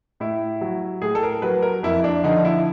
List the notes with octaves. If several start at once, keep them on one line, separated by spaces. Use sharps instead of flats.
A2 E4
F#3
A2 G#4
A4
A#4
F#3 B4
A#4
F2 E4
D4
D3 F3 D#4
E4